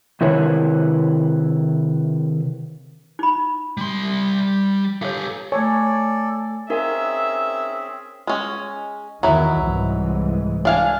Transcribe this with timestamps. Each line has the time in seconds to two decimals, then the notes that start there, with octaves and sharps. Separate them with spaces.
0.21 C3 D#3 E4 B4 C#5
3.19 D#4 B5
3.77 G3 C6
5.02 G4 A4 C#5 F5
5.52 A3 A4 C#5 D5 G#5
6.70 C4 C#4 D#4 G#4 A#4 E5 F5
8.27 G#3 C#4
9.23 E2 D#3 F#3 E4
9.63 C2 G#2 E3
10.65 D4 F5 G#5